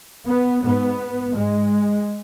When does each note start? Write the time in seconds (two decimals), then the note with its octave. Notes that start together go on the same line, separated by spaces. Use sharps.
0.28 B3
0.64 G#2 B3
1.35 G#2 G#3